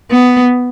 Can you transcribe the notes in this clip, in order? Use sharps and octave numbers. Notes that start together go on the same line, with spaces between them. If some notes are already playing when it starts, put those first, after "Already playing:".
B3